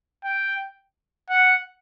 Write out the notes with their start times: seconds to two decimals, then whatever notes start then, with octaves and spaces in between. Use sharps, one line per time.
0.24 G5
1.29 F#5